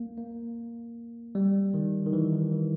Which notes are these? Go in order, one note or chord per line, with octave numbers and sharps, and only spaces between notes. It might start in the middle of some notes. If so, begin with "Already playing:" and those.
Already playing: A#3
A#3
G3
D#3
D#3
E3
D#3
E3